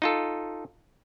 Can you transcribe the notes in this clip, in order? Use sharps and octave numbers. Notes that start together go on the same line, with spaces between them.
D#4 F4 A4